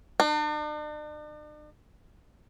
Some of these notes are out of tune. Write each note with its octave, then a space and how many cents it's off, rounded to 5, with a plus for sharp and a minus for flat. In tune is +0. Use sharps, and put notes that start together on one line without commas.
D4 +45